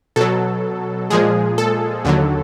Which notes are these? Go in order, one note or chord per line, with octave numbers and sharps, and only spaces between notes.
B2 F#3 A4
A#2 F3 G#3 G#4
A4
D#2 D3 F#3